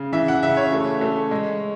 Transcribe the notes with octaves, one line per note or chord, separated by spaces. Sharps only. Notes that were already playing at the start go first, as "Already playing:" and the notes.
Already playing: C#3
E3 E5
F#5
C#3 E5
C#5
A3
A3
G#3